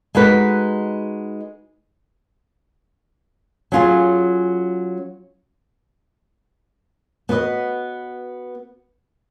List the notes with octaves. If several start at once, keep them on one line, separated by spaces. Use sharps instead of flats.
G#3 D#4 F#4 B4
F#3 C#4 F4 G#4
B3 F#4 B4 D#5